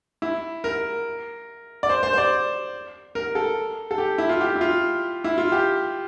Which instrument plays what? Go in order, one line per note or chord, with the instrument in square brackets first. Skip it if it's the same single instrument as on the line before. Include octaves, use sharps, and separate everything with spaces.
[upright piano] E4
A#4
D5
C5
C5
C5
D5
A#4
A4
A4
G4
E4
F4
G4
E4
F4
E4
F4
G4